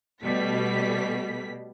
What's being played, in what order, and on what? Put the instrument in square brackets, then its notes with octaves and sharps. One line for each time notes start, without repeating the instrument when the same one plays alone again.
[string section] B2 G3 A3 B6